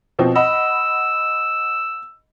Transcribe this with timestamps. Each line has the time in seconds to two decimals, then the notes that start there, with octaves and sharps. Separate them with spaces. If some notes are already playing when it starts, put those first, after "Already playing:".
0.19 B2 F3 C4
0.36 D#5 F#5 B5 E6